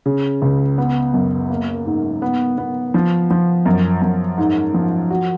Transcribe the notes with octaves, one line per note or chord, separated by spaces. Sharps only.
C#3
C#2
B3
F#2
A#3
G#2
B3
B3
F3
F3
F#2
F#2
G#2
F3
F#4